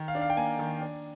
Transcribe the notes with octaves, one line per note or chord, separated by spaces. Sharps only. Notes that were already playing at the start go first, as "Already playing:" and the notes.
Already playing: D#3
F5
D4
F5
G5
A#3 G#5
D#3
D4